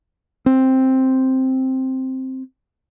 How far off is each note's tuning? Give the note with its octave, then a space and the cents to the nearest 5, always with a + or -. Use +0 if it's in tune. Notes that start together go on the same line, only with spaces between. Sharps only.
C4 +5